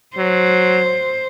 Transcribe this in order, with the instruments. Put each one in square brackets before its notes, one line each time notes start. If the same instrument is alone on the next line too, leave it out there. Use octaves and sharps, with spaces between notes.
[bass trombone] F#3 [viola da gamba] C5